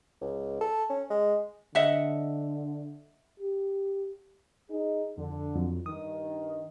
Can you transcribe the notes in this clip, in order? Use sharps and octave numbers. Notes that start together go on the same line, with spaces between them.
C#2
A4
C#4
G#3
D3 D#5 E5 F#5
G4
D#4 G#4
F2 D3
F2 F#3
G2 D#3 D#6